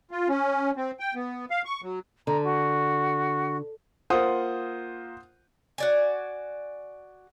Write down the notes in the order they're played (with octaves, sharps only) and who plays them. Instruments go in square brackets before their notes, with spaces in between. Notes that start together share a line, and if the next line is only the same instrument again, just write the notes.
[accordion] F4
C#4
C4
G5
B3
F5
C#6
F#3
[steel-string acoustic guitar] D3 [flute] A#5
[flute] F#4
[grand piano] A#3 F4 [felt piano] C5 F#5 D#6
[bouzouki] F#4 D5 G#5